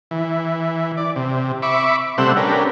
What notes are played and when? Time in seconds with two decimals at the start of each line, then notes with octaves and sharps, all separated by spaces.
0.11 E3
0.97 D5
1.16 C3
1.62 E5 B5 C#6 D6
2.18 C3 G3 A3 C4 F#5 E6
2.37 C#4 D4 G4 A#4 B4